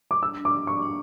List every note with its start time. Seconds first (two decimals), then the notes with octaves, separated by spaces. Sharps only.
0.11 D6
0.22 D4 E6
0.37 D4
0.45 D6
0.52 D4
0.67 D4 C#6
0.82 D4